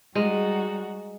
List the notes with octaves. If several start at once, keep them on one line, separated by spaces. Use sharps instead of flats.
G3 G#3 D#4 F#4